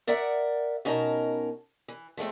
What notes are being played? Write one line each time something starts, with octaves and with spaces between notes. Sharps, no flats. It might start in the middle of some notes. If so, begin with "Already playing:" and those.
A#4 D5 E5 F#5
B2 C#4 D#4 A#4 A5
E3
F3 G#3 A3 C4